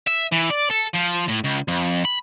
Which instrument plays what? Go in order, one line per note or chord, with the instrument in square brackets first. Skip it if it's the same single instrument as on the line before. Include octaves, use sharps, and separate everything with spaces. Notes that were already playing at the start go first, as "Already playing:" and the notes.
[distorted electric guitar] E5
E3
D5
A4
F3
A2
C#2
F2
B5